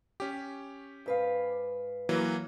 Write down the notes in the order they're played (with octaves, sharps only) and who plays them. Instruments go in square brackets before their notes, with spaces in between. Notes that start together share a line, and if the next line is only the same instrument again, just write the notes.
[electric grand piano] C#4 G4
[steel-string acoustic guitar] G#2 B4 F5
[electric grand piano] E3 F#3 A#3